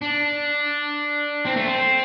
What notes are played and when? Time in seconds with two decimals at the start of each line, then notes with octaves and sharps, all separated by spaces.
0.02 D4
1.45 C4
1.56 A3
1.66 C4